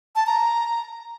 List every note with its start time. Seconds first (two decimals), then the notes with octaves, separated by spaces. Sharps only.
0.16 A5
0.27 A#5